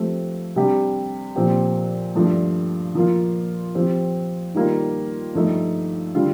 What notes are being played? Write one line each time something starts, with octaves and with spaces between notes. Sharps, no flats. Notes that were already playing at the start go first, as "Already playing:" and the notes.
Already playing: F3 A3 C4 G4
C3 G3 D4 G4
A#2 F3 C4 G4
G2 F3 A3 D4
F3 A#3 F4
F3 C4 G4
D#3 G3 A#3 F4
G2 F3 A3 D#4
D3 G3 D4 F4